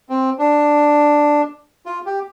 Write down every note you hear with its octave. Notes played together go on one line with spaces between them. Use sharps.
C4
D4
F4
G4